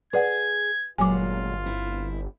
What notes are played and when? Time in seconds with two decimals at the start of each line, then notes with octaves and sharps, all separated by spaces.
0.13 G#4 B4 D5 F#5 G#6
0.98 G1 A#2 F#3 G#3 F4 G#5 D6
1.66 C4 E4